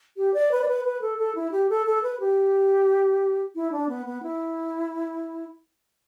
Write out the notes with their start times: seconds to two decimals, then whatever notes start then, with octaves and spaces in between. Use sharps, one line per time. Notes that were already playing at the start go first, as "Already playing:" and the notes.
0.17 G4
0.34 D5
0.52 B4
0.62 D5
0.68 B4
0.85 B4
1.02 A4
1.18 A4
1.35 E4
1.52 G4
1.70 A4
1.86 A4
2.03 B4
2.20 G4
3.55 E4
3.72 D4
3.89 B3
4.06 B3
4.23 E4